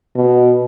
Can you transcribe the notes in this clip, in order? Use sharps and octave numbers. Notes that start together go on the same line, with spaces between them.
B2